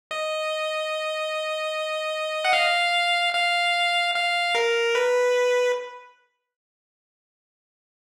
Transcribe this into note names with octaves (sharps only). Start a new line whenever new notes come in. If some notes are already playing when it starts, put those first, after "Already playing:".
D#5
F#5
F5
F5
F5
A#4
B4